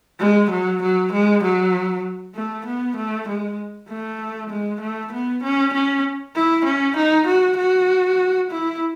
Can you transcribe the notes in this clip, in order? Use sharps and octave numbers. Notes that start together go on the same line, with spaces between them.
G#3
F#3
F#3
G#3
F#3
A3
B3
A3
G#3
A3
G#3
A3
B3
C#4
C#4
E4
C#4
D#4
F#4
F#4
E4